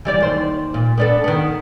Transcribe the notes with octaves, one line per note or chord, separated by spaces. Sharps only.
E3 G3 D5
D#2 C5
A#2
B3 D4 A4
D#3 B3